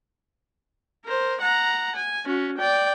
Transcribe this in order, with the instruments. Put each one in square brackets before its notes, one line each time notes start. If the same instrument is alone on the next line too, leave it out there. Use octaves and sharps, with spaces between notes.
[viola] A#4 C5
F#5 A#5
G#5
C#4 F#4
D5 G5